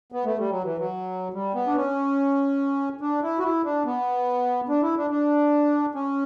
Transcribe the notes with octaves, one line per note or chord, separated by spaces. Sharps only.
B3
A3
G3
F#3
E3
F#3
G3
B3
D4
C#4
D4
E4
F#4
E4
D4
B3
D4
E4
D4
D4
C#4